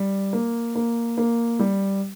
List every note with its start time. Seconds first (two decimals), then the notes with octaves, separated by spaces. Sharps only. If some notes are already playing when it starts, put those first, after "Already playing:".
Already playing: G3
0.33 A#3
0.75 A#3
1.18 A#3
1.59 G3